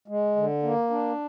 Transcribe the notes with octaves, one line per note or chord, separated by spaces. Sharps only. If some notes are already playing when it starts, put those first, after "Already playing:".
G#3
D3
A#3
D4